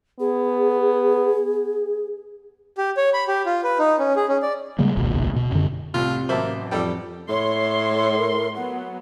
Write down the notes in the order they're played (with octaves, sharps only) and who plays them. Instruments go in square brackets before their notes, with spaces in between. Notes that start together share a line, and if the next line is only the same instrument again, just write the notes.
[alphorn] B3 [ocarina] G#4
[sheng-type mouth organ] G4
C#5
B5
G4
F4
B4
D#4
C#4
G#4
C#4
D5
[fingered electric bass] C#3 G3 G#3 A#3
D#1 G#1 C#2 B2
B2
F#2 D3
[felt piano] C2 A2 C4 [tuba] C3 [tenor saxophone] F4
[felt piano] A1 F#3 [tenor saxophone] A#3 [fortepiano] C5 E5 A5
[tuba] F2 [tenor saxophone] G3 [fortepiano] A4 D5 G5
[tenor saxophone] A2 [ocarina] C#5 [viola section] C6
[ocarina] A#4
[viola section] F#3 B3 [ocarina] F#5